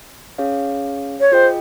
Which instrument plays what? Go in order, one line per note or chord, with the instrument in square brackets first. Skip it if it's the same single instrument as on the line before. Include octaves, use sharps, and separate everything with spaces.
[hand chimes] C#4 G#4 C#5 F5
[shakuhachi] C#5
[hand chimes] F4 G#4 D#5 G5 [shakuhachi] C5